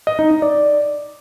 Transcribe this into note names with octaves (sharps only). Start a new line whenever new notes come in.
D#5
D#4
D#4
D5